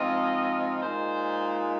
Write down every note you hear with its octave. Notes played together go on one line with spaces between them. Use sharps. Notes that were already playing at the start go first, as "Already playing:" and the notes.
Already playing: G#2 F3 C4 F4 D#5
A#2 G#3 D#4 C5